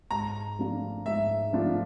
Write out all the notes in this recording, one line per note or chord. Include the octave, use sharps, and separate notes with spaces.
G#2 A#5
F3 A3 D4 F4
G#2 E5
F3 A3 D4 F4